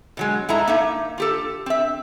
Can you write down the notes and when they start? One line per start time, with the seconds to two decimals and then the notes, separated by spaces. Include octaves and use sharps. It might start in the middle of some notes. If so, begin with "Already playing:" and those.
0.17 B2 F#3 G#3
0.49 G#2 E4 A4 A#5
0.67 A#3 D#4 E5
1.18 F4 G4 A4
1.66 C4 E5